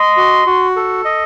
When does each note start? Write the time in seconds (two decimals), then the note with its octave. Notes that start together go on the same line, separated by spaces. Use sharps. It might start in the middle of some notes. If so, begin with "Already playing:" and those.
Already playing: D#5 C6
0.17 F#4
0.47 F#4
0.76 A4
1.05 D#5